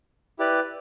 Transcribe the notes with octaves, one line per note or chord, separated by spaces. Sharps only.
E4 G4 B4 D5